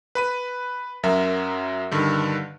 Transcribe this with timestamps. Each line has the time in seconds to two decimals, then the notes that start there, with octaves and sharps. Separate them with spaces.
0.15 B4 B5 D#7
1.03 F#2 F#3 A#4 E5 A#5
1.91 G2 D3 D#3